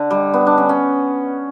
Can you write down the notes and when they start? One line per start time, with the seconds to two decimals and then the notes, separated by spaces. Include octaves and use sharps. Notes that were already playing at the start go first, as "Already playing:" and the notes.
Already playing: D3
0.11 G3
0.33 B3
0.47 D4
0.58 C#4
0.69 C#4